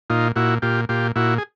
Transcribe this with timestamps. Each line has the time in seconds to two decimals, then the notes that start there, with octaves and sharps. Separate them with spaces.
0.10 A#2 D#4 F4
0.36 A#2 E4 F#4
0.62 A#2 F4 G4
0.89 A#2 F4 G4
1.16 A#2 E4 F#4
1.38 G#4